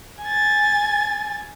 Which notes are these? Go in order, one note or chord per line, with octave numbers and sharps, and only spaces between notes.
G#5 A6